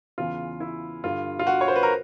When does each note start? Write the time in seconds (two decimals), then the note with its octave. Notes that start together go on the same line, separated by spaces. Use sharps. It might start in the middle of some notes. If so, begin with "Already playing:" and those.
0.18 E2 C#3 E3 F4
0.60 E4
1.03 G2 D3 F4
1.39 F4
1.47 F#4
1.61 C#5
1.68 C5
1.76 B4
1.83 A#4